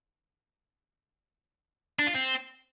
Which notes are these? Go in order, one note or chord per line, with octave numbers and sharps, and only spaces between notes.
D4
F4
C4